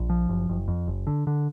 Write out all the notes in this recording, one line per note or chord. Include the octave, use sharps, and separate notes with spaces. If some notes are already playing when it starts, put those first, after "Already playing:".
Already playing: A#1
F3
F#1
F#1
F2
F#1
D3
D3